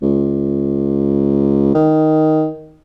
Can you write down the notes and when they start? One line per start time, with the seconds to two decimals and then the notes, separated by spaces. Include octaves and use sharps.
0.02 C#2
1.75 D#3